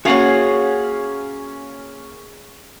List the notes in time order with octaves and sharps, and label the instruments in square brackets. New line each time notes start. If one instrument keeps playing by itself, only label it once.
[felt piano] A#3 C#4 [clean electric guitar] F#4 F5 F#5 [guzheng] G#4 C#5